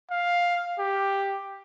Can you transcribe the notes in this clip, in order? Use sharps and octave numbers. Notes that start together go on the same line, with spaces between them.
F5
G4